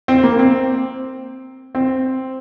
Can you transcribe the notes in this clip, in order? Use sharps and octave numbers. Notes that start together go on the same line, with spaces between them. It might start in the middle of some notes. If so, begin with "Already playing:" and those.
C4
A#3
C4
C4